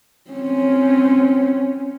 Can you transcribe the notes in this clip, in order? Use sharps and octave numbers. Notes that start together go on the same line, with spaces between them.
C4 C#4